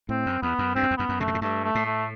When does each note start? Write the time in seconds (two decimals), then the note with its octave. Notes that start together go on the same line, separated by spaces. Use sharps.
0.09 A2 C4
0.26 F#2
0.42 E2 B3
0.59 F#2
0.75 G2 C4
0.83 F#2
0.91 E2
0.97 F#2 B3
1.09 F#2
1.20 C3 A3
1.27 B2
1.34 A2
1.41 G2 A3
1.64 A3
1.75 A2
1.86 A3